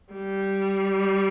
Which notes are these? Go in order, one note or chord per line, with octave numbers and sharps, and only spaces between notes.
G3